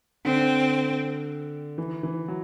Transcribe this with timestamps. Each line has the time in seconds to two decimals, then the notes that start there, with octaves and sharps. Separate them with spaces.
0.25 D3 C4
1.78 E3
2.03 E3
2.28 F#3